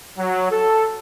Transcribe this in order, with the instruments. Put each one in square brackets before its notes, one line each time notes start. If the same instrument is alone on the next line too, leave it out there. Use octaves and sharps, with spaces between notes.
[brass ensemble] F#3
A4